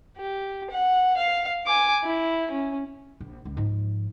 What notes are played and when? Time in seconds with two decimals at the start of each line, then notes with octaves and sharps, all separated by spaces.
0.17 G4
0.70 F#5
1.17 F5
1.66 G#5 D6
2.04 E4
2.51 C#4
3.20 A#1
3.45 C#2
3.57 G#2 F3